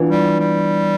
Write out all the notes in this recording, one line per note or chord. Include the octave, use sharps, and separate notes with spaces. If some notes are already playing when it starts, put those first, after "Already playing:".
Already playing: E3 B3 D4 F4
G3
G3